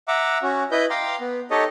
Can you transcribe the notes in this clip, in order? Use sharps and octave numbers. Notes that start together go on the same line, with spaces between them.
E5 F#5 A#5 D6
C#4 F#4
E4 B4 D#5 G6
F5 G5 A#5 C6 D6
B3
D#4 G4 A4 C#5 D#5